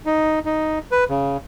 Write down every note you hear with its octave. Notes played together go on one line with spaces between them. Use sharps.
D#4
D#4
B4
C#3